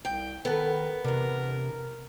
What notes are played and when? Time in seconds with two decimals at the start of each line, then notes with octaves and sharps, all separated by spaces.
0.05 C2 G5
0.45 D#3 B3 A4 B4
1.04 E2 C3 D4 A#4